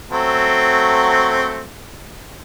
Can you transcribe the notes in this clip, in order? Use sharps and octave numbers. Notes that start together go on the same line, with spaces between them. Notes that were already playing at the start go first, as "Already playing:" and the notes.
F#3 A3 C4